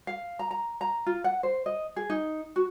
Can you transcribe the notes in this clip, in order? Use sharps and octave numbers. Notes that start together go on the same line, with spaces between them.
F5
A#5
A#5
A#5
F4
F#5
C5
D#5
G#4
D#4
F#4